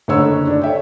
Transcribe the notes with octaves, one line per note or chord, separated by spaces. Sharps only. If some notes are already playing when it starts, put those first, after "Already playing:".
F#1 D3 C#5 E6
D4
C#5 E5 G5